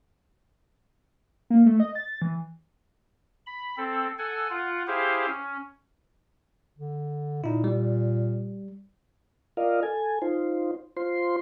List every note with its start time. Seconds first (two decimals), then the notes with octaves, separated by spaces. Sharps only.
1.50 A#3
1.66 A3
1.80 D#5
1.95 A6
2.22 E3
3.46 B5
3.77 C4 A4
4.18 A4 F#5 G#5
4.50 F4 F#5
4.87 E4 G4 G#4 C5 F5
5.26 C#4
6.79 D3
7.44 A#2 D#4 E4
7.64 G3
9.57 F4 A#4 D5 D#5 F5
9.83 A4 G#5
10.22 D#4 F4 C5
10.97 F4 C5 C6